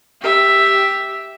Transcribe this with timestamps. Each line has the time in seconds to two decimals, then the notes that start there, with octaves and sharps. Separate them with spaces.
0.21 G4 E5